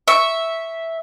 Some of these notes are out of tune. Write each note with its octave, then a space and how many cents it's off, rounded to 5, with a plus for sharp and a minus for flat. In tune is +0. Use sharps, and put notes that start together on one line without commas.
E5 -5 C#6 +0